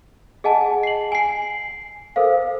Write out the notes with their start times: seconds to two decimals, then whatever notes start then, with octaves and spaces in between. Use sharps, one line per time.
0.44 G#4 D#5 F#5 G#5 A5
0.83 C7 F#7
1.12 G#5 C7
2.16 A4 A#4 C5 F5